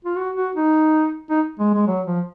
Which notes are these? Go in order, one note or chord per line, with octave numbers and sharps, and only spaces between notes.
F4
F#4
F#4
D#4
D#4
G#3
G#3
F#3
F3